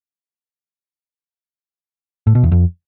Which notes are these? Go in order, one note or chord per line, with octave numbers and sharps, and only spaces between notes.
A2
B2
E2
F2